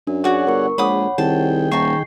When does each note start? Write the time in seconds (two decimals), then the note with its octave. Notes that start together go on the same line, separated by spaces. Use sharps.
0.07 F#2 D4
0.24 F#4 G#4 C#5 D5 F#5
0.47 G1 A#4 C#6
0.78 A#1 G#3 C#5 F#5 B5 D6 D#6
1.18 C2 D#3 G#4 G5 A5
1.72 D#1 D#4 A5 C#6 C7